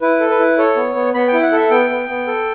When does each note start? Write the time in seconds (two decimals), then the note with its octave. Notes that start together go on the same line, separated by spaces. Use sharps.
0.02 E4 B4
0.20 A4
0.30 B4
0.39 E4
0.58 A4 C#5
0.76 B3
0.95 B3
1.14 B3 B5
1.28 G5
1.33 E4
1.43 F#5
1.52 A4 E5
1.70 B3 G5
1.90 B3
2.09 B3
2.27 A4